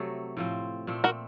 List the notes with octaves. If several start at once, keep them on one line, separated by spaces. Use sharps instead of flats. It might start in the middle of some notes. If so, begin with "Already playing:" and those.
Already playing: C3 F#3 A3
A2 F3 C4
A#2 A3 C4
F#4 A#4